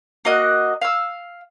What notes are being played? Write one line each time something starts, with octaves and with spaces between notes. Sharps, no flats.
A#3 F#4 D#5 F#6
F5 E6